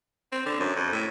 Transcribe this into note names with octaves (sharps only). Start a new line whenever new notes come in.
C4
D3
F#2
F2
A2